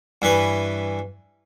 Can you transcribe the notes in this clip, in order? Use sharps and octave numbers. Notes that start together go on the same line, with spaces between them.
G2 E3 B4